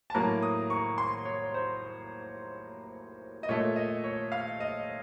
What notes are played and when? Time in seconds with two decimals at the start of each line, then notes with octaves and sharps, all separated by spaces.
0.10 A5
0.14 A2 F#3 A#3 A#5
0.43 D#6
0.70 C#6
0.98 C6
1.25 C#5
1.54 C5
3.43 D#5
3.49 A#2 A3 C#5
3.76 D#5
4.04 C#5
4.32 F5
4.60 D#5